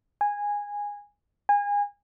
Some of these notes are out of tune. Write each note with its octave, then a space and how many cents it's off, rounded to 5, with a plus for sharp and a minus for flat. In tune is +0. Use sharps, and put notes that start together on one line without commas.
G#5 -15
G#5 -30